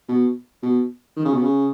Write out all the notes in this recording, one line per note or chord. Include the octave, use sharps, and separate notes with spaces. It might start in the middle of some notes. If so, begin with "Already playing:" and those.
B2
B2
D#3
C#3
B2
C#3